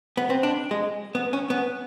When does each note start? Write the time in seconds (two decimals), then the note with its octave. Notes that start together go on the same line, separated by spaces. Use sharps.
0.17 B3
0.30 C4
0.43 D4
0.71 G#3
1.15 B3
1.33 C#4
1.50 B3